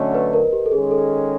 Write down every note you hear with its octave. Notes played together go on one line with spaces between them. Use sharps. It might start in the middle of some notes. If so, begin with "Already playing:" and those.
Already playing: D3 F#3 A3 C#4 D#5
B4
A#4
G4
A4
D#3 G#3 C#4 G#4
A4